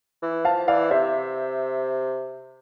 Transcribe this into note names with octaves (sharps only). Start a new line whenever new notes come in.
E3
F3 F5 A5
E3 D5 F5
C3 C5 E5